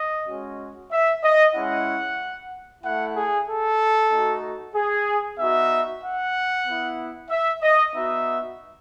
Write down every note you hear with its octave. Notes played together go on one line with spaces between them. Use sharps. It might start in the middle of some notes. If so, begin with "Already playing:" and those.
Already playing: D#5
G#3 C#4 F#4
E5
D#5
G#3 C#4 E4 F#5
A3 E4 F#5
G#4
A4
A3 D#4 F#4
G#4
B3 D#4 F#4 E5
F#5
B3 E4
E5
D#5
B3 D#4 F#4 E5